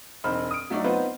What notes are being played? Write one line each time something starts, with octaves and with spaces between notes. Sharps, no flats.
E1 C4 D#4 B5 F6
D#6 D7
F#3 A3 D4 D#4 D5
B3 C4 D#4 F4 B4 C5